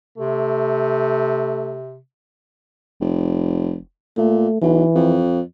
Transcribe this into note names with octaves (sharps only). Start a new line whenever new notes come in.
C3 A3
F1
A#2 A3
B1 E3
F2